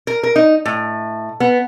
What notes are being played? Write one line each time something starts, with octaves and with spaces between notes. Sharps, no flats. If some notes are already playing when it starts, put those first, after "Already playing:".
A#4
A#4
D#4
A2
B3